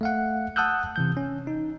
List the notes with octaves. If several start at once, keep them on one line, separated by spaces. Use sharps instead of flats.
A3 F5 F#5
F#5 A5 D#6 E6 F#6 G6
C3 E3 G6
C#4
D#4